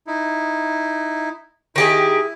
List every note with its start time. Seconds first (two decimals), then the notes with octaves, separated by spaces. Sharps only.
0.07 D#4 E4
1.76 D#3 E4 G4 G#4